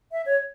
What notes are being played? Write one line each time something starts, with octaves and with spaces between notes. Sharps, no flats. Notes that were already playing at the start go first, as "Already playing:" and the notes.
E5
C#5